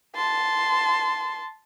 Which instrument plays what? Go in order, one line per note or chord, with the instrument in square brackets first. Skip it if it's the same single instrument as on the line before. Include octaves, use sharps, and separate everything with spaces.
[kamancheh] A5 C6